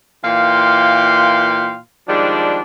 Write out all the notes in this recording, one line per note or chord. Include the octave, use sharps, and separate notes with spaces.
A#2 E3 A#3 F5 G5 C6
D#3 F3 G3 G#3 D4